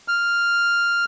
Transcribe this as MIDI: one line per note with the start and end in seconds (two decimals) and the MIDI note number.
0.08 1.05 89